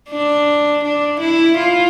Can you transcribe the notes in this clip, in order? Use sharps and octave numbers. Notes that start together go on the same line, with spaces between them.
D4
D4
E4
F4